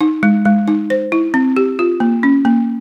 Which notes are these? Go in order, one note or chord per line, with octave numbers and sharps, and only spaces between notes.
D#4
G#3
G#3
D#4
C5
E4
C4
G4
F4
A#3
C#4
A#3